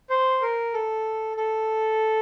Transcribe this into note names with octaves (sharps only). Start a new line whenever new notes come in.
C5
A#4
A4
A4